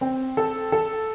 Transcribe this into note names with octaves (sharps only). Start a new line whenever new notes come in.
C4
A4
A4